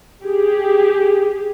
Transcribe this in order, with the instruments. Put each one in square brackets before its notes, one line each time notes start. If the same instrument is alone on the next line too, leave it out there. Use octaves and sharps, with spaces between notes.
[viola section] G4 G#4